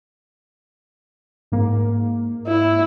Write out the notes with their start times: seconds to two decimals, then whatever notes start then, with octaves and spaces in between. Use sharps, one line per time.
1.52 G#2 A#3
2.47 E4